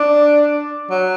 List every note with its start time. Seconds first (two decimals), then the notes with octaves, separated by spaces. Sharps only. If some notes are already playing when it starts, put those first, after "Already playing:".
Already playing: D4
0.91 F#3